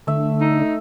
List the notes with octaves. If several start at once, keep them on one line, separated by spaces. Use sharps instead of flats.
D3 A3 E5
D#4